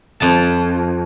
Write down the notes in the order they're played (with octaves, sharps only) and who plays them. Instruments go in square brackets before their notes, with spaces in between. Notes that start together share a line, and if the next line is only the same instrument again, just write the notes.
[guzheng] F2 A5